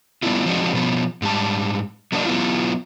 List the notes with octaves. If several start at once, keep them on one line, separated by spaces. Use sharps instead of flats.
G3 B3 C4 D4 E4 F4
F3 G#3 C4 D4 D#4 F#4
B2 F3 B3
G#2 G3 A5
F#3 A#3 C4 D4 D#4
F#3 B3 E4 F4